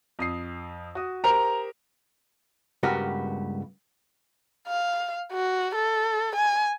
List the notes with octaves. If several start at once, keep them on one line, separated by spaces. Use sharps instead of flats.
F2 D#6 C7
F#4 D#6
G4 A#4 C5 A#5 F7
C#2 G2 B3 F#4 G4 A#4
F5
F#4
A4
G#5